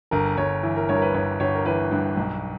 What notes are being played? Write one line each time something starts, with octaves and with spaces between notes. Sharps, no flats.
G1 A#4
G1 C#5
E3
A#4
G2 C#5
A#4
B4
G1 C#5
G1 C#5
A#4
E3 B4
G2
B1